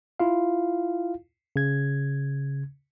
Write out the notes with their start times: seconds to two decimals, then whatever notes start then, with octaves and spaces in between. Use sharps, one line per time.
0.20 E4 F4 F5
1.56 C#3 G#6